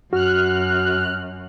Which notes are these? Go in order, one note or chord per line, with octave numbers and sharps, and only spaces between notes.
F#2 F#4 F6 F#6